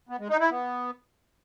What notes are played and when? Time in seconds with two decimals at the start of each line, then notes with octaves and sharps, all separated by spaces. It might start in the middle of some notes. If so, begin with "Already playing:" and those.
0.09 B3
0.19 G#3
0.30 D#4
0.40 E4
0.50 B3